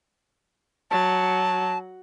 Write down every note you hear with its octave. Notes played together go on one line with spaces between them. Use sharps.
F#3 A5